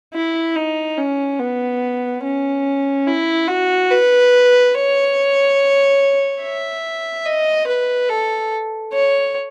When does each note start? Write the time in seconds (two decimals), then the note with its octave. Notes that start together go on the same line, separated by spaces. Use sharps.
0.14 E4
0.55 D#4
0.97 C#4
1.39 B3
2.23 C#4
3.07 E4
3.48 F#4
3.91 B4
4.74 C#5
6.42 E5
7.26 D#5
7.67 B4
8.09 A4
8.93 C#5